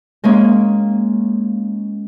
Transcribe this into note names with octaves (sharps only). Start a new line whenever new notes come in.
G#3 A#3 C#4